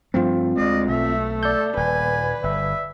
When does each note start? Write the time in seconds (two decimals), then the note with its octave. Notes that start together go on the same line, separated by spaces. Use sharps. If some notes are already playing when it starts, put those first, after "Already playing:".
0.14 G2 F3 A3 C4 F4
0.57 D2 G#3 D5 D#5
0.88 B1 A3 E5
1.43 A4 D5 G6
1.77 D#1 B4 G#5
2.44 G1 E5